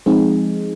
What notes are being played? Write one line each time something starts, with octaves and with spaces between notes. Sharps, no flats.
F3 G#3 C4 D#4 G#4